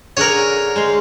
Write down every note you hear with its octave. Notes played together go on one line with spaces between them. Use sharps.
D3 G#4 A#4 C#5 F#5
G#3 C5 F5